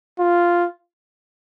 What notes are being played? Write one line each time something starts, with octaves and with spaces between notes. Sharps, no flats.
F4